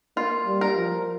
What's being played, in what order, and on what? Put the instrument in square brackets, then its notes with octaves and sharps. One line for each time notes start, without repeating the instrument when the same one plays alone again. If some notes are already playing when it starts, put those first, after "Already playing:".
[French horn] A#3 [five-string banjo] F4
[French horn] G3
[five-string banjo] A#4
[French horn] F3